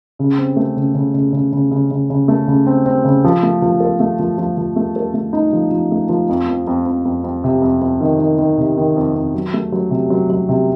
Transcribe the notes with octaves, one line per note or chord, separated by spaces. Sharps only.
C#3
C4
A3
C#3
C#3
C#3
C#3
C#3
C#3
C#3
C#3
A3
C#3
C4
C4
C#3
F3
A3
F3
A4
A3
F3
F3
F3
A3
A4
A3
D#4
F3
F3
A3
F3
F2
F2
F2
F2
F2
F2
C3
F2
F2
D#3
D#3
D#3
C3
D#3
F2
F2
F#3
A3
F#3
C3
F#3
F#3
C3